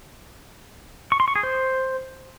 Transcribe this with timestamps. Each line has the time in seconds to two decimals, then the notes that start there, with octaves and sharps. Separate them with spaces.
1.12 C#6
1.20 C6
1.28 C#6
1.36 G#4
1.43 C5